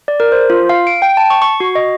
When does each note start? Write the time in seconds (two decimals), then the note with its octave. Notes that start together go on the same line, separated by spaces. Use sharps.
0.08 D5
0.20 A#4
0.32 C5
0.50 F4
0.69 F5
0.87 D7
1.02 G5
1.17 A5
1.30 C#6
1.42 C#6
1.60 F#4
1.75 D#5